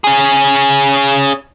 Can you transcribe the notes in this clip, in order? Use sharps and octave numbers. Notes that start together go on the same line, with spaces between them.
C#4 G#4